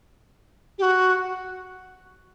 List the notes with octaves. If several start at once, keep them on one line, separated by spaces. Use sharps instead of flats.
G4
F#4